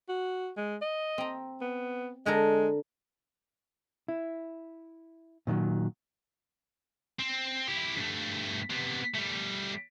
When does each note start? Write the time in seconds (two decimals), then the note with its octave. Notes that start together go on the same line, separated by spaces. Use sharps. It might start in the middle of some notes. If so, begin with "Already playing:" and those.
0.09 F#4
0.57 G#3
0.82 D#5
1.18 C4 A#5
1.61 B3
2.26 D3 G#3 A4 A#4
4.08 E4
5.47 A#2 D#3 E3 F#3
7.20 C4
7.68 E4 G4
7.98 G2 A3
8.70 C3 B3
9.15 G3 A3